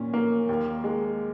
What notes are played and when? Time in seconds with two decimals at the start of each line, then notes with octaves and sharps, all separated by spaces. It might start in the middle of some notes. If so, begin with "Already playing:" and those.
Already playing: A#2 C#4
0.14 A#3
0.49 D#2
0.84 G#3